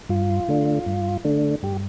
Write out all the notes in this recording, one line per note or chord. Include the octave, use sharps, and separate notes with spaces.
G2 F4
D3 A3 D4
G2
D3 A3 D4
G2 G4